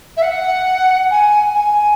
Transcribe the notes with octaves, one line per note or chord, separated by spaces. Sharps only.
E5
F#5
G#5
G#5